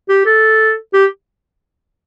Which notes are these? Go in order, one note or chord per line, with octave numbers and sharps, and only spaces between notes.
G4
A4
G4